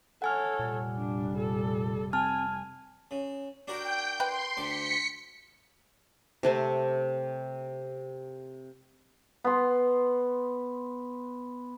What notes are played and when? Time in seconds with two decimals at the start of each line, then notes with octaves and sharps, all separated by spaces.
0.22 A4 C#5 F#5 G#5 F6
0.59 F1 A#2 G3
0.98 D4
1.37 A#2 A4
2.13 C4 G#5 A5 F6
3.11 C#3
3.68 D4 F#4 A#4 G5 G6
4.20 B4 G5 C6
4.57 D2 C6 D6 B6 C#7
6.43 C3 A3 C4
9.44 B3 C6